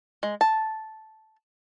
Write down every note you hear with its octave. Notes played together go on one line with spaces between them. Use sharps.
G#3
A5